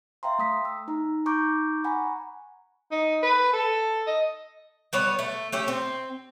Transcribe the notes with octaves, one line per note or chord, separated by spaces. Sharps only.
E5 F5 G5 A#5 C6
A3 D#6 B6
E6
D#4 A#5
D#4 A#5 C#6 D6 G6
F#5 G#5 A#5 B5 C#6
D#4
B4
A4
D#5
G3 B3 C#5
A3
A3 C#4 G4
C4